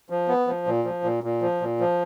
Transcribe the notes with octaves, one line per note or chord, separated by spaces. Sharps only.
F3
B3
F3
A#2
F3
A#2
A#2
F3
A#2
F3